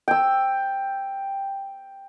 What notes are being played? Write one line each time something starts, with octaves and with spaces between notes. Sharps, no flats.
G5 E6